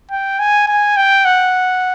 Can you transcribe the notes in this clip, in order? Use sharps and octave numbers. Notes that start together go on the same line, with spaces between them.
G5
G#5
G#5
G5
F#5